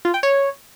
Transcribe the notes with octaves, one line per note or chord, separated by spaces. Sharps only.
F4
G5
C#5